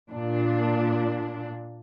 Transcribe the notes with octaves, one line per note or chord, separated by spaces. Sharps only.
A#2 D4